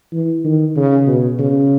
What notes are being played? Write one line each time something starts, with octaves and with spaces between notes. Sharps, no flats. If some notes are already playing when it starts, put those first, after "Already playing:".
E3
D#3
C#3
B2
C#3